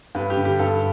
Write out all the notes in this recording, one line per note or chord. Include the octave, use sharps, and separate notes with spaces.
G2 B4
G4
D3
G4
G2 A4